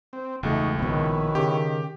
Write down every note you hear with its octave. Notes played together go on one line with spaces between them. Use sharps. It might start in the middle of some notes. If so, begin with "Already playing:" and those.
C4
E1 C#2 A3 D#4 F#4
A#1 B2 D#3 B3 C#4 E4
C#3 G4